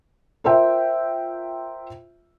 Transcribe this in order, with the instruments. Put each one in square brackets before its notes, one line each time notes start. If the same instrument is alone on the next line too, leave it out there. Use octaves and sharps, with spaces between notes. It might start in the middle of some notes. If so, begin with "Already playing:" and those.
[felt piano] F4 A#4 C5 E5 G5